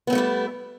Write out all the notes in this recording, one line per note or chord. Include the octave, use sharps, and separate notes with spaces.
G3 A3 B3 C4 E4